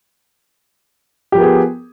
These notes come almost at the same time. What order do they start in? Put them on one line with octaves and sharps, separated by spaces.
G4 F3 A#4 B3 G#4